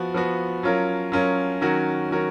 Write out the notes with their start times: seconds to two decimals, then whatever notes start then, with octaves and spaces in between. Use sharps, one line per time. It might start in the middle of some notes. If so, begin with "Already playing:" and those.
Already playing: F3 B3 F#4
0.14 F3 B3 F#4
0.63 F#3 C#4 F4 A#4
1.12 F#3 C#4 F4 A#4
1.61 D#3 F#3 C#4 F#4 A#4
2.10 D#3 F#3 C#4 F#4 A#4